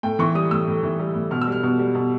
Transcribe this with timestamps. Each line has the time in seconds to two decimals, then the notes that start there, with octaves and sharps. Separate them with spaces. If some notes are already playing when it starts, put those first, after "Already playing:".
0.03 A2 G5
0.19 E3 C#6
0.35 G3 D#6
0.51 A2 E6
0.67 A2
0.83 E3
0.99 G3
1.15 A2
1.31 B2 F6
1.41 E6
1.47 G3 F6
1.63 B2
1.79 G3
1.95 B2